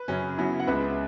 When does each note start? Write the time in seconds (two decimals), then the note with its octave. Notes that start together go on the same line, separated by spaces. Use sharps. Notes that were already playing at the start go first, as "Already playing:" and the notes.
Already playing: B4
0.08 F#2 C#3 F#3 C#4
0.38 C#3 F#3 B3 E4
0.60 F#5
0.67 C#2 C#3 G#3 B4 E5